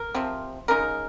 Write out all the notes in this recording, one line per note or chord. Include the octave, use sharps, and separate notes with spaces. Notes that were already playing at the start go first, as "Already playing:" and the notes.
Already playing: A#4
C3 F3 C4
C#3 G#3 D#4 A#4